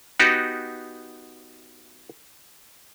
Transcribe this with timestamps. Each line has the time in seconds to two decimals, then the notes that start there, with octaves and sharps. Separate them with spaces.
0.20 B3 D#4 F#4 G4